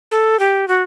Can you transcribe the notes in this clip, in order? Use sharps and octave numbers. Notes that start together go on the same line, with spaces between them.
A4
G4
F#4